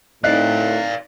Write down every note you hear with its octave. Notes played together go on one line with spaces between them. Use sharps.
A2 C4 D#4 D5 D#5 F5 F#6